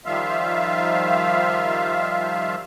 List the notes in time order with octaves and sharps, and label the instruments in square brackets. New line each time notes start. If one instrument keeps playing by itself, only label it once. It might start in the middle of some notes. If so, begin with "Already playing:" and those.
[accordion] D#3 F3 G3 F4 E5 F5